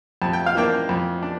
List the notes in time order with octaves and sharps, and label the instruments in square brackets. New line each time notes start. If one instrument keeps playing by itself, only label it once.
[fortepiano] F2 A5
G5
F5
E3 A#3 D4 G5
F2
D4